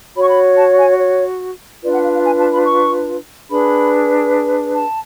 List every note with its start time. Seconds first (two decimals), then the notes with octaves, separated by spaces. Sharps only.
0.15 F#4 C#5 B5
0.23 C#6
0.29 B5
0.57 A5
0.78 G#5
0.99 C#5
1.83 D4 F4 B4 D5
1.93 F#5
2.03 F5
2.14 F5
2.24 G#5
2.39 A5
2.51 B5
2.66 C#6
3.50 D4 G#4 B4 B5
4.75 A5